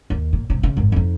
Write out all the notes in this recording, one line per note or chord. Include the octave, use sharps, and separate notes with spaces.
D#2
A#2
G2 C3
C#3
G#1 F#2
F2 D#4